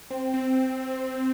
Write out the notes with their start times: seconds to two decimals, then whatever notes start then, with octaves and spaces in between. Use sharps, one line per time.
0.11 C4
0.34 C4